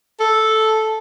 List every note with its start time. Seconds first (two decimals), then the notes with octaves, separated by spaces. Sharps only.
0.20 A4